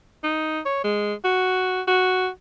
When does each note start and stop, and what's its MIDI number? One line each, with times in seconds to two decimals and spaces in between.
0.24 0.60 63
0.66 0.80 73
0.84 1.14 56
1.25 1.82 66
1.87 2.29 66